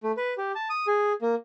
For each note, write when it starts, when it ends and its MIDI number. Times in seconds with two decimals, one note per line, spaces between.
0.03 0.12 57
0.17 0.34 71
0.38 0.52 67
0.55 0.69 81
0.69 0.86 87
0.87 1.13 68
1.22 1.35 58